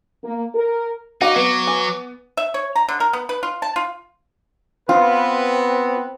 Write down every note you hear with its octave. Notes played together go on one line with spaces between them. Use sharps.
A#3
A#4
D#4 F#4 D5 F5 D6
F#3 B3
G#5
E5
C#5
A#5
D3
A#4
B3
B4
F4
A5
F4
B3 C4 F4 B4